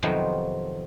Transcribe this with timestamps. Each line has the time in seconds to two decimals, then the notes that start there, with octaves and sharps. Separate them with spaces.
0.03 F2 C3 D#3 F3 F#3 B3